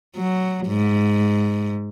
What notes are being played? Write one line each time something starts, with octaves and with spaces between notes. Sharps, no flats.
F#3
G#2